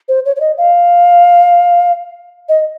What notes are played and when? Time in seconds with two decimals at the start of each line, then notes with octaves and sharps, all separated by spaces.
0.08 C5
0.26 C#5
0.36 C#5
0.40 D#5
0.58 F5
2.49 D#5